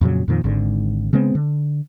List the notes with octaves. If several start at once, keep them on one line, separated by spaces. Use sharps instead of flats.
F2 A#2 C#3 F#3
F2 A#2 D#3 F3
G#1 G#2 D3
C#3 G#3 B3 C4
D3